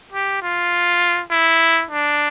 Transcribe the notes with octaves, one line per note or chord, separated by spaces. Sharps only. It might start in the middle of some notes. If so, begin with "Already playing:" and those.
G4
F4
E4
D4